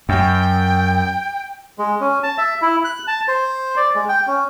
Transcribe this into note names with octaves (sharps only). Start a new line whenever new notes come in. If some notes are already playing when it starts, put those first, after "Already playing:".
F#2 G5
G#3
C#4
A5
E5
E4
F#6
A5
C5
D5
G#3
G5
C#4